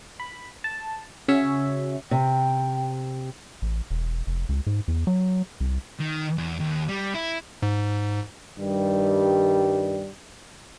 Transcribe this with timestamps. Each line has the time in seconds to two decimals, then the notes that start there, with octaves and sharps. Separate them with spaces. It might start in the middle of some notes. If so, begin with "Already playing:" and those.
0.20 B5
0.64 A5
1.28 C#3 C#4 F#4 C#5 E5
2.11 C3 G5
3.62 A1
3.90 E1
4.27 F1
4.49 C#2
4.67 G#2
4.88 E2
5.07 F#3
5.60 C2
5.99 D#3
6.38 E2
6.60 D#2
6.89 G3
7.14 E4
7.63 G#2
8.59 G2 D#3 G3